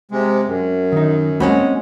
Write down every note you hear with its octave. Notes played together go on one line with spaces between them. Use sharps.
C3 G#3
F#2
D#3 D#4
G#3 A#3 C4 C#4 F#4 B5